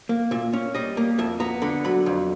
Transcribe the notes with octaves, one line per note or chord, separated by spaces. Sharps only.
A#3
A#2 E5
C#4
G3 D#5
A#3
F2 E5
B3 A#5
D3 B5
F#3 B5
F2